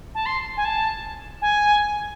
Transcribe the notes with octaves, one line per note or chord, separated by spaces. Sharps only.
A5
C6
G#5
A5
G#5